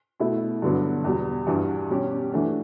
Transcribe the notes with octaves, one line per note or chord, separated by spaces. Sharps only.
B2 A3 E4
G2 D3 F#3 B3 D4
E2 B2 G3
G2 E3 G3 D4 F#4
B2 G3 C#4 G4
E3 A3 D4 F#4